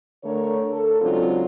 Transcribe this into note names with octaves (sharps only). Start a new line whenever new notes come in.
D3 A3 A#4 C#5
A4
G#2 C#3 F#3 C4 D4 F4